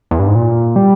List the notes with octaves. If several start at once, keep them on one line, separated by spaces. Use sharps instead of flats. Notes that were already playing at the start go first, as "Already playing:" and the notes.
E2
G2
G#2
A#2
G3